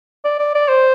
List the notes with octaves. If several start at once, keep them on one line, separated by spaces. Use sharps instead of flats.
D5
D5
D5
C5